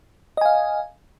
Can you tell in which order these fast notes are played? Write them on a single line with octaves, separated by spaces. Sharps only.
D#5 G#5 F5